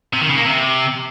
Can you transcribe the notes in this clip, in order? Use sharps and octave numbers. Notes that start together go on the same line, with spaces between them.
C3
D#3
C#3
A#3
C3